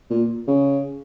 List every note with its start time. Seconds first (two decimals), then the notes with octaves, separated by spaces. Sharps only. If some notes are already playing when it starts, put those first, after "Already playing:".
0.10 A#2
0.47 C#3